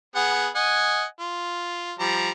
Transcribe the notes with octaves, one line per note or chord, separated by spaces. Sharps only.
B3 G#4 F#5
D#5 F#5 G#5
F4
F3 G3 A#5